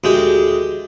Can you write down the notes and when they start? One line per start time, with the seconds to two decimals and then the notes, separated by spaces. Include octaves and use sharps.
0.04 D2 G#3 G4